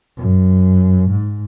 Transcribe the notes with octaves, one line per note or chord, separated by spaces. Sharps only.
F#2
G#2